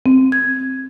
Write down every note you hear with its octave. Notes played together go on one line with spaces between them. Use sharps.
C4
G#6